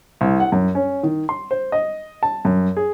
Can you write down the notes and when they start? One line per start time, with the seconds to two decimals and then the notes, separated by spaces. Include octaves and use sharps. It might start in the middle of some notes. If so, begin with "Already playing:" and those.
0.21 C2
0.40 F#5
0.52 F#2
0.75 C#4
1.03 D#3
1.29 C6
1.51 C5
1.72 D#5
2.23 A5
2.45 F#2
2.77 G#4